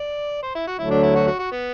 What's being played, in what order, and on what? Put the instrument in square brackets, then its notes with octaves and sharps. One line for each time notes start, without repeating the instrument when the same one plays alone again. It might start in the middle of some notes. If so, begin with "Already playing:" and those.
Already playing: [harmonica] D5
C5
E4
F#4
[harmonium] D2 D3 F#3 A3 [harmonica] E4
[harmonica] D4
E4
F#4
F#4
F#4
B3